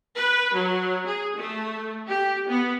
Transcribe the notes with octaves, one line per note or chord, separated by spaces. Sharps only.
B4
F#3
G#4
A3
G4
B3